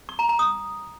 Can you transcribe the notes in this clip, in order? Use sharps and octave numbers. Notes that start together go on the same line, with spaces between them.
C#6
A#5
A#5
D#6